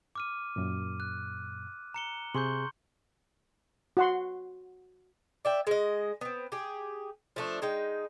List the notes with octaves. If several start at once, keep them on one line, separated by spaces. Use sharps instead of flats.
D6 F6 D#7
F#2 A#2
F#6
A#5 C#7 G7
C3 G#4 C6 C#6 G6
F#4 F#5 C6
D5 E5 G5
G#3 D#5
B3 C4
G4 G#4
F3 A3 D4
G#3 D#4 G5